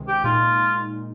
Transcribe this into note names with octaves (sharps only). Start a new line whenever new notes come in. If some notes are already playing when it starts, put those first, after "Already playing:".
Already playing: C#2 C3 D#3 G#3
G4
A#2 G#3 D#4 F4